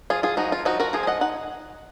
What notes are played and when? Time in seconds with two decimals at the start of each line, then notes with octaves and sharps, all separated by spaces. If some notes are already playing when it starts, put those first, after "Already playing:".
0.10 F3 F4 G#4
0.23 F4 G#4
0.37 F3 D#4 F#4
0.52 F4
0.65 F3 D#4 F#4
0.80 F#4 A#4
0.93 F3 G#4 C5
1.03 G#5
1.07 D#5 F#5
1.21 D#4 F#5